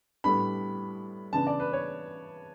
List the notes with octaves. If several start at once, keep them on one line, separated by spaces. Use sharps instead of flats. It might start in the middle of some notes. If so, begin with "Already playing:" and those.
A2 G3 B3 D4 B5
C#3 E3 B3 D4 A5
D5
B4
C#5